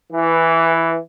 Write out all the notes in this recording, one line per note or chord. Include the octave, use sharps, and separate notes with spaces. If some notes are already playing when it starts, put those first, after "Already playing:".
E3